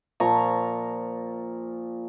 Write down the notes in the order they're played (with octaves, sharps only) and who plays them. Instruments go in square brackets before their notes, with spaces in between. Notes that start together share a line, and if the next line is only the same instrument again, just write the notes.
[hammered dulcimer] A#2 F3 A#5 C#6